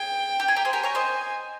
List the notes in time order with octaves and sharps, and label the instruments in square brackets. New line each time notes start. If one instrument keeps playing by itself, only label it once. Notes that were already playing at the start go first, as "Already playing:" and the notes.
Already playing: [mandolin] G#4 [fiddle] G5
[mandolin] G4
G#4
G4 A#4
G#4 C5
[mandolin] G4 A#4 [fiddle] G#5
[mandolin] A#4 C#5
C5 D#5